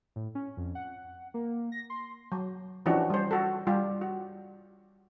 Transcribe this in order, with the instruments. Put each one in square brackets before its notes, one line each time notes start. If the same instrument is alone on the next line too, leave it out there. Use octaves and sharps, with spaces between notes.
[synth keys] A2
C#4
F2
F#5
A#3
A#6
C6
[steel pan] F#3
E3 F3 C#4 D4 F#4 G4
G3 C5
F#4 A4
G3 F4 G4
F#4